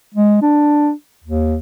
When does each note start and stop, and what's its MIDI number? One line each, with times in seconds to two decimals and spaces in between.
0.14 0.38 56
0.42 0.91 62
1.24 1.57 39